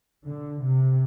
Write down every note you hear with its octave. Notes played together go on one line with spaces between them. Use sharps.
D3
C3